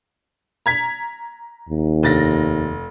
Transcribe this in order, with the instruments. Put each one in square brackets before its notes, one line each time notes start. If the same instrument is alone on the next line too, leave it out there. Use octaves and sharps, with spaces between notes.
[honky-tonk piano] A#5 G#6 B6
[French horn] D#2
[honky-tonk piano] F1 A6 A#6